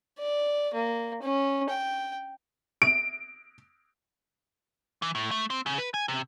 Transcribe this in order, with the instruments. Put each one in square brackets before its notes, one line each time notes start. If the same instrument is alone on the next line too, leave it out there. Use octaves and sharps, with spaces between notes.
[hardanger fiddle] D5
A#3
C#4
G5
[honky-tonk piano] D7
[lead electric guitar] E3
A2
A3
C4
C#3
B4
G#5
C3